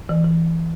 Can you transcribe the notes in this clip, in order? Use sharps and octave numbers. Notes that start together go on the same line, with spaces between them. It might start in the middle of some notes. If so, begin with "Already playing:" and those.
E3
E3